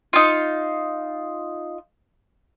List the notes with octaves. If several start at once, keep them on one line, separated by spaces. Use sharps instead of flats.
D#4 F4